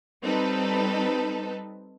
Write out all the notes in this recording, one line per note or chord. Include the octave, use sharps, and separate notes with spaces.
G3 C4 D#4 A4 B4